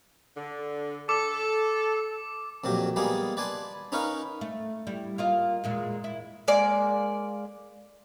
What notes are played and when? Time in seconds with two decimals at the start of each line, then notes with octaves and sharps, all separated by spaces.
0.36 D3
1.09 A4 D6
2.64 F2 A#2 F#3 G4
2.96 G3 G#3 A#3 B3 G#4
3.37 B4 D5 G#5 A5 C6
3.92 C#4 D#4 A#4 B4 F5 C#6
4.41 A3
4.87 G3 E4
5.18 A#3 F4 D#5
5.64 E2 A#2 G#3
6.04 E4
6.48 G#3 A#3 D5